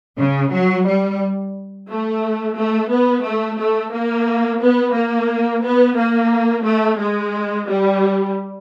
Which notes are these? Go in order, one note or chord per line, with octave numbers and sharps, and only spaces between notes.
C#3
F#3
G3
A3
A3
B3
A3
A3
A#3
B3
A#3
B3
A#3
A3
G#3
G3